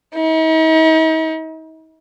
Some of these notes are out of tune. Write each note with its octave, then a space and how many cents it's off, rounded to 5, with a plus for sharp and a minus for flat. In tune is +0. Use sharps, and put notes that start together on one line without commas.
D#4 +45